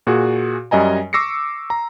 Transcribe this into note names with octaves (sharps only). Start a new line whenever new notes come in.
A#2 F#4 G#4
F#2 G3 D#5 G#5 A#5
C#6 D6 E6 A#6 C7 C#7
A#5